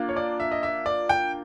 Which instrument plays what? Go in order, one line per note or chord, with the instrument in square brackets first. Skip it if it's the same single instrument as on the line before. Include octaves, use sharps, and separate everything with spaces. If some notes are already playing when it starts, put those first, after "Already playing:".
Already playing: [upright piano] A#3 D4 F4
[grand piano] C#5
D5
E5
D#5
E5
D5
G5